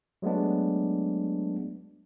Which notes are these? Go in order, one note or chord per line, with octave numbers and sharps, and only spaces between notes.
F#3 G#3 A3 B3 D4